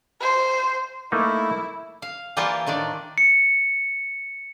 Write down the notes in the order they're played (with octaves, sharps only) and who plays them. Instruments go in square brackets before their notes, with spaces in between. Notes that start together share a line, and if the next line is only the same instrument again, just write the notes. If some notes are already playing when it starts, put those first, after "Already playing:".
[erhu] C5
[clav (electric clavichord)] A3 A#3 D#4 [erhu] E4
[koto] F5
E3 G3 A#3 F4 G#5 A5
A2 D#3 D4 D5
[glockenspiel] C#7